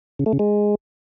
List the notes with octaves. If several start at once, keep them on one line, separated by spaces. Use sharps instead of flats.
C#3
A3
C#3
G#3